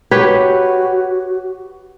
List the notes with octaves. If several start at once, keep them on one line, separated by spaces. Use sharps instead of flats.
F#4 G4 B4 C#5